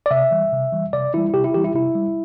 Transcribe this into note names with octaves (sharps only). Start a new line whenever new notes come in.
D5
C3 E5
E3 G3
C3
E3 G3
C3 D5
E3 G3 E4
E4
C3 G4
E4
E3 G3 G4
E4
C3 E4
G3